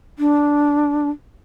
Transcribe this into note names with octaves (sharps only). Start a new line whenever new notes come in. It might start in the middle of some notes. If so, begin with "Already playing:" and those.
D4